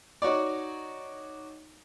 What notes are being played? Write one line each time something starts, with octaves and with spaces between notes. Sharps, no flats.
D#4 F#4 C#5 D5